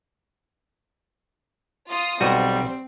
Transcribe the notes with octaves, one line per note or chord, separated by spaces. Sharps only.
F4 D#6
B1 G3 C4 F#4